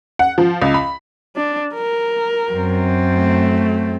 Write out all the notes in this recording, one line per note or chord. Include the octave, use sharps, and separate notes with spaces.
F#5
F3
C#2
B5
D4
A#4
F#2 C4
A3